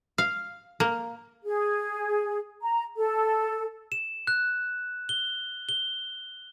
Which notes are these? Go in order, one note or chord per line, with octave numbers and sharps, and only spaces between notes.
F5
A#3
G#4
A#5
A4
E7
F#6
G7
G7